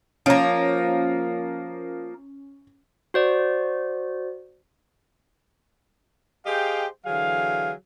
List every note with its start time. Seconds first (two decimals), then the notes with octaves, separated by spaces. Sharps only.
0.26 F3 A#3 C#4
3.14 F#4 C5 D5
6.46 G4 G#4 C5 D#5 F5 G5
7.06 D3 E3 F#3 G#4 F5